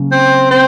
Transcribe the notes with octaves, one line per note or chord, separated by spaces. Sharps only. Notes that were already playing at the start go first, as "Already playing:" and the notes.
Already playing: C#3 F#3 A#3 C#4
C4
C4